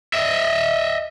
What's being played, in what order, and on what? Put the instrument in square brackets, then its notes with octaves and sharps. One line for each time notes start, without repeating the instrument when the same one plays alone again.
[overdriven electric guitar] D#5 E5